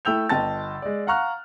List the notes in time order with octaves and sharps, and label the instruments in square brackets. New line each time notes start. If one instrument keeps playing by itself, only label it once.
[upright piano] A3 E4 G5 E6 G6 F7
G1 D#5 G5 A5 A6
G#3 D5
F5 F#5 A#5 C#6 F6 F#6